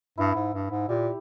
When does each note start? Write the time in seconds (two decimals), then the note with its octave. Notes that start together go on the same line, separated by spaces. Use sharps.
0.18 G2 E4
0.35 G#2
0.54 G2
0.71 G#2
0.89 A#2 G4